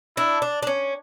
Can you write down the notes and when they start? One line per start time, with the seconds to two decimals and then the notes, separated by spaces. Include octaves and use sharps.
0.17 D4 E4
0.42 D4
0.62 D4
0.67 C#4